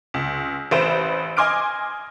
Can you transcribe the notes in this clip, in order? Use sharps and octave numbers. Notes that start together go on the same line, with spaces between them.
C#2
A1 B4 C5 D7 E7
D#5 G#5 C6 D6 F6 D7